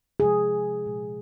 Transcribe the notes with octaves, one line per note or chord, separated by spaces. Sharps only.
C3 F3 G#3 G#4
A#2 G#3